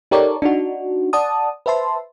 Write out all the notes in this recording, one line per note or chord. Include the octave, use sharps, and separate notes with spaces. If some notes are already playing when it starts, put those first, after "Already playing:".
D#4 G4 A4 A#4 C#5 D5
D4 D#4 F#4
D5 F#5 A5 D#6
B4 C5 E5 A5 C6